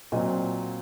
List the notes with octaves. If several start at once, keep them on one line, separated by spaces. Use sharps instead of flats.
A#2 F#3 C4 D#5